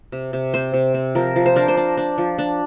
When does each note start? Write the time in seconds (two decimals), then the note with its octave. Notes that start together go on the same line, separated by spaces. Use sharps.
0.12 C3
0.33 C3
0.54 C4 C5
0.74 C3
0.94 C4
1.15 F3 A#4
1.36 F3
1.46 C5
1.56 D4 A#4
1.68 C5
1.77 D4
1.97 D4
2.18 F3
2.38 D4